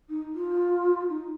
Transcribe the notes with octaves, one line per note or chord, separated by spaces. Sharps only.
D#4
F4
D#4